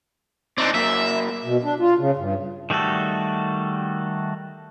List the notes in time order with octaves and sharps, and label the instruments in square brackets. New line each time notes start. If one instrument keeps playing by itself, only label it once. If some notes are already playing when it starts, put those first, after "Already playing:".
[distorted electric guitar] C4 D4 [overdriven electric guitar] D#4 D5
[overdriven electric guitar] F#3 A#3 [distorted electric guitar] E5
[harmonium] B2
D4
F4
C#3
G2
[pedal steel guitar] D#3 G3 A3 F#4 A4